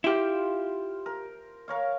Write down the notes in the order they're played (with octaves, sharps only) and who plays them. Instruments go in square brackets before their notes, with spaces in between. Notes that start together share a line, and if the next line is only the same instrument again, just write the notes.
[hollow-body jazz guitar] E4 G4 [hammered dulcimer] F4 C5 F5
[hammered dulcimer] A#4
A#4 C#5 F5